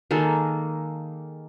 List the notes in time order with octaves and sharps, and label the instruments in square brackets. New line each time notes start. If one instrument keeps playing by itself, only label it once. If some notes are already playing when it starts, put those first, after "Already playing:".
[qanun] D#3 G#3 A#3 A4